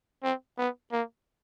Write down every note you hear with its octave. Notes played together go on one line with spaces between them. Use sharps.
C4
B3
A#3